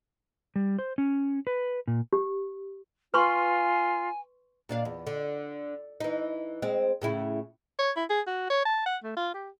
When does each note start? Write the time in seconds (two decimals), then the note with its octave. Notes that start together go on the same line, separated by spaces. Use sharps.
0.56 G3
0.79 C5
0.98 C#4
1.47 B4
1.87 A#2
2.13 G4
3.14 F4 B4 G#5 C6 C#6
4.69 A#2 D4 F5
4.85 E2
5.07 D3
6.00 E3 D#4
6.62 G#3 C4
7.02 A2 C#3 E4
7.79 C#5
7.97 E4
8.10 G#4
8.27 F#4
8.50 C#5
8.66 A5
8.86 F#5
9.04 A3
9.17 F4
9.34 G4